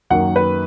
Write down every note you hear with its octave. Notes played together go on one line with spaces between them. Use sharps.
F#2 D#3 F#3 A#3 F#5
B4